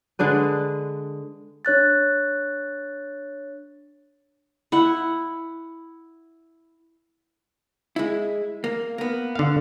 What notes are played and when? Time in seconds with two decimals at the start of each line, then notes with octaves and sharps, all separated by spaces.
0.19 D3 G#3 D4 B4
1.65 D4 C#5 F#6 A6
4.72 E4 F#5
7.96 G#3 E4
8.64 A#3
8.98 A#3 B3
9.35 D3 F5